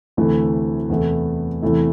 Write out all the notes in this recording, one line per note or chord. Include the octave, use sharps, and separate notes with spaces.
D2 C3 E3 A3 E4
E2 C3 E3 A3 E4
E2 C3 E3 A3 E4